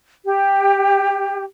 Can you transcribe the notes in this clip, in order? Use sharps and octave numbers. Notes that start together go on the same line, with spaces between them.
G4